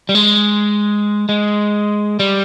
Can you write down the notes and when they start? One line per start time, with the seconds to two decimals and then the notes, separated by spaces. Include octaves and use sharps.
0.09 G3
0.15 G#3
1.29 G#3
2.19 G3